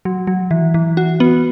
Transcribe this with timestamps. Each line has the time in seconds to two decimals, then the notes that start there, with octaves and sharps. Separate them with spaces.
0.05 F#3
0.27 F#3
0.51 E3
0.74 E3
0.97 F#4
1.20 B3